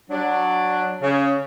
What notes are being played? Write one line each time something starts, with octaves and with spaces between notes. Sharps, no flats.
F#3 D4
C#3